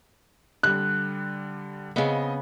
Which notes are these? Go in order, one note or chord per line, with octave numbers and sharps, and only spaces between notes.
D3 G3 F#6
C#3 B3 C4 D#5 F5